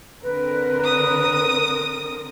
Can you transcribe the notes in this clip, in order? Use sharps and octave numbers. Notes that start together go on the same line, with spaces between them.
D3 C4 A#4 B4
D#6